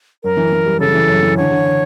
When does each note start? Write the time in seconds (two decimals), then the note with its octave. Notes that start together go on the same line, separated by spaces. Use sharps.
0.23 F#2 A#4
0.37 E3
0.52 E3
0.65 G3
0.80 C#3 A4
0.94 E3
1.09 F#2
1.23 E3
1.37 D3 C#5
1.51 D3
1.65 D3